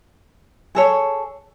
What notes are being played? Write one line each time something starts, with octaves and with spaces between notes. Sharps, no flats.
G#4 A4 C#5